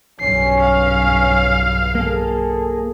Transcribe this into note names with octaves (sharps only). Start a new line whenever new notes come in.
B1 G2 C#4 C7
F5
A#3 G#4 A4